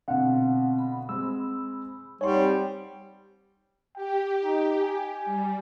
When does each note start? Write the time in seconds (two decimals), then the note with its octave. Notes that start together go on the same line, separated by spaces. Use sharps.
0.08 B2 D3 C4 F5 F#5
0.78 B5
1.09 G#3 C4 E6
2.21 G3 D#4 C#5 F#5 G#5 C6
2.33 C4 C5
3.96 G4 G5
4.43 D#4
4.80 G#5
5.25 G3